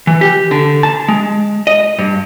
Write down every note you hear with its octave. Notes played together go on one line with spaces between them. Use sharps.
E3
G4
D3
A5
G#3
D#5
G2